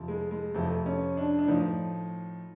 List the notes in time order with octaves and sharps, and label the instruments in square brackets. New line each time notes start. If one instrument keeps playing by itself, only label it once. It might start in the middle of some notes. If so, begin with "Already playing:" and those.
Already playing: [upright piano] F2 C3 F3
G#3
G#3
F2 C3 F3 A3
C#4
D4
D4
A2 F3 D#4